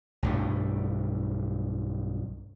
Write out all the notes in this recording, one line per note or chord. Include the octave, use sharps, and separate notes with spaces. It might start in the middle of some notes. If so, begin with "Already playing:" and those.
B1 G2 A3